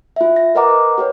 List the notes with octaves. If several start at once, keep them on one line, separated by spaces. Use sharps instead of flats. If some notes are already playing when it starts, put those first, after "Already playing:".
F4 E5
A#6
A#4 B4 D#5 F#5 A#5 D6
G4 B4 C#5